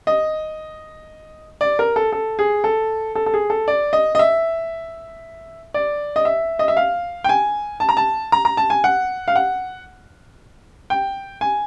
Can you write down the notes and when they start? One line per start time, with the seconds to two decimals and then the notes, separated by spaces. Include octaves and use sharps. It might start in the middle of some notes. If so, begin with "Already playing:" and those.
0.07 D#5
1.61 D5
1.79 A#4
1.96 A4
2.12 A4
2.39 G#4
2.64 A4
3.15 A4
3.26 A4
3.34 G#4
3.50 A4
3.68 D5
3.93 D#5
4.15 D#5
4.19 E5
5.74 D5
6.16 D#5
6.25 E5
6.59 D#5
6.68 E5
6.77 F5
7.24 G5
7.29 G#5
7.80 A5
7.89 A#5
7.97 A5
8.32 A#5
8.45 A#5
8.57 A5
8.70 G#5
8.84 F#5
9.28 F5
9.36 F#5
10.90 G5
11.41 G#5